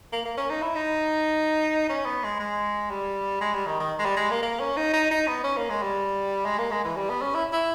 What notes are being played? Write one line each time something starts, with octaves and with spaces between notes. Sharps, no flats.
A#3
A#3
C#4
D#4
E4
D#4
C#4
B3
G#3
G#3
G3
G#3
G3
D#3
D#3
G#3
G3
G#3
A#3
A#3
C#4
D#4
D#4
D#4
B3
C#4
A#3
G#3
G3
G#3
A#3
G#3
E3
G3
B3
C#4
E4
E4